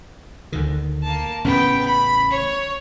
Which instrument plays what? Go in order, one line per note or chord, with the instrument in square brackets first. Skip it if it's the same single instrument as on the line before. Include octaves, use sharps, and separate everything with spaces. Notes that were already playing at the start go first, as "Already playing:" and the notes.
[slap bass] D2 D3 D#3
[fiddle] A#3 A5
[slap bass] A1 C#3 C#4 [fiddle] B3 G5
[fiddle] B5
C#5